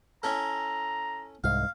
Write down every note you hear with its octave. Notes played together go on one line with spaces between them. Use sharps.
C#4 E4 A4 A#5
C2 G#2 F5